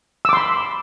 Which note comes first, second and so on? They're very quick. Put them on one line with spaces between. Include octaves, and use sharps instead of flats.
E6 D6 C6 B5